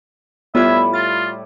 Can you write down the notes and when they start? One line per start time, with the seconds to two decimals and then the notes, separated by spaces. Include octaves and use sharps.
0.55 A2 G3 B3 F4 E5 B5 G#6
0.94 F4 A6